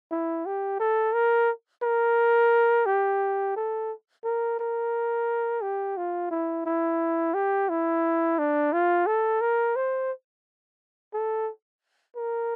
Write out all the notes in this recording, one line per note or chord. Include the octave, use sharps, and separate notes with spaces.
E4
G4
A4
A#4
A#4
G4
A4
A#4
A#4
G4
F4
E4
E4
G4
E4
D4
F4
A4
A#4
C5
A4
A#4